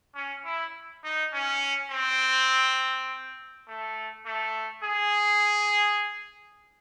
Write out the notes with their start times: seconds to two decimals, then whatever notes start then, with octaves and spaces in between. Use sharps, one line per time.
0.15 C#4
0.44 E4
1.04 D#4
1.33 C#4
1.91 C4
3.68 A3
4.26 A3
4.84 G#4